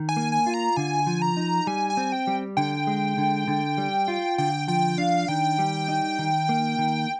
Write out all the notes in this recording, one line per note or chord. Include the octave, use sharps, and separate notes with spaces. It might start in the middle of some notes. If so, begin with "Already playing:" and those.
Already playing: D#3
G#5
A#3
G#5
F4
A#5
D3 G#5
F3
A#5
D#4
G3 G#5
G#5
C4
G5
G3
D3 G5
G#3
D3
D3
G3
F4
D3 G5
F3 G5
D4 F5
D#3 G5
G3
D#4
D#3
A#3
D#3